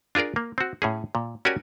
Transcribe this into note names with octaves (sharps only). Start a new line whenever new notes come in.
D4 F4 G#4 A#4 D5
A#3
C4 F#4
A2 C#4 G#4
A#2
C#4 F#4 G4 A#4 D5 G#5